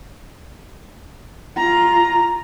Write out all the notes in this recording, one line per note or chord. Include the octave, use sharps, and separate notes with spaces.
F4 A#5